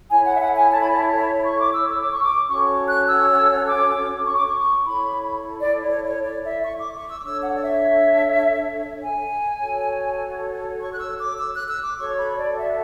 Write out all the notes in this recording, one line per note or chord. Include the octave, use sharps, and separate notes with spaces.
E4 A4 C#5 G#5
F#5
E5
F#5
G#5
A5
B5
A5
B5
C#6
D6
E6
E6
D6
C#6
D6
C#4 F#4 A4 C#5 C#6
F#6
E6
D6
C#6
D6
C#6
E4 A4 C#5 B5
D5
C#5
C#5
C#5
D5
E5
C#6
D6
C#6
E6
D6
D4 A4 C#5 E6
F#5
D5
E5
G#5
F#4 A4 C#5
C#6
F#6
E6
D6
E6
F#6
E6
D6
F#4 A4 C#5 C#6
B5
C#5
D5
E5